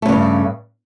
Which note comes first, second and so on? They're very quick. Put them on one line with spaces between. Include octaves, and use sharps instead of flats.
A3 C#3 G2